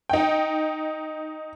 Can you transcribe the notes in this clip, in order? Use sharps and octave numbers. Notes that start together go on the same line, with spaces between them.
D#4 G5